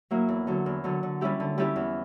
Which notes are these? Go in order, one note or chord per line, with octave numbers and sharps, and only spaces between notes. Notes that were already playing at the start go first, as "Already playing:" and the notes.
F#3 A#3 E4
E2
D3 F#3
E2
D3 F#3
D3
G3 C#4 E4 G4
D3
G3 C#4 E4 G4
E2